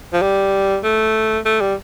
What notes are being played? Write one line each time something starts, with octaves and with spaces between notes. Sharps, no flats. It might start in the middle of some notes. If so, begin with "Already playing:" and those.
F3
G3
A3
A3
G3